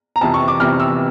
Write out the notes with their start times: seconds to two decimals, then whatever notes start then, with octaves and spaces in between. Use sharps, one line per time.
0.16 A#5
0.21 F2 C3 E3 A5
0.34 C#6
0.48 D6
0.60 F2 C3 E3 F6
0.80 E6